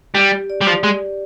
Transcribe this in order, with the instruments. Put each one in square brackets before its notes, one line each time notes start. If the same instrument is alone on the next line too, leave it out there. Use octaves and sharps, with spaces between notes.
[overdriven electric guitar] G3 [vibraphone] G4
[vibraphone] D5
[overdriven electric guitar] G3
F3
G#3